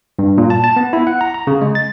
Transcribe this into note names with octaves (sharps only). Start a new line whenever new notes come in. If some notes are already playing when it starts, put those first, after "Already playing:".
G2
A#2
A5
A5
B3
E4
F#5
A#5
A#5
C#3
G#3
A6